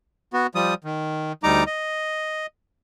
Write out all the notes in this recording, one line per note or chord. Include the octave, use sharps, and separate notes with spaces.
B3 F#4
F3 G3 D#6
D#3
D2 G3 D#4 A#5 D6
D#5